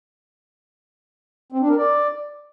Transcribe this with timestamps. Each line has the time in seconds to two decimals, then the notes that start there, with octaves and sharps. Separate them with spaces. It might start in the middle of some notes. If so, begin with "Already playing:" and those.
1.52 C4
1.61 D4
1.69 A#4
1.77 D5